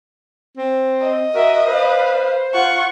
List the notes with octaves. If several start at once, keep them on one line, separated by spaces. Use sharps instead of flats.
C4
D#5
F#4 A#4 E5
B4 C5 F5
F4 F#5 C#6